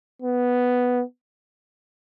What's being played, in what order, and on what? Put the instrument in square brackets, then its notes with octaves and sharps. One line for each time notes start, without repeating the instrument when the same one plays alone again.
[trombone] B3